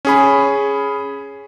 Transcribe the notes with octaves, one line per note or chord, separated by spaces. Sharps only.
C#4 G#4 B5